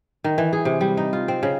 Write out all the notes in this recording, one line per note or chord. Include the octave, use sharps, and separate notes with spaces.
D#3
E3
G#4
C3
G3
D#4
F4
C4
C#3